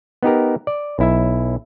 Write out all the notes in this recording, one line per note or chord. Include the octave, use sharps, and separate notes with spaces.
B3 D#4 G4 A#4
D5
B1 E4 E5